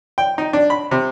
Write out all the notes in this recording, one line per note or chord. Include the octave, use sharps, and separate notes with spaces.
G5
D#4
D4
B5
C3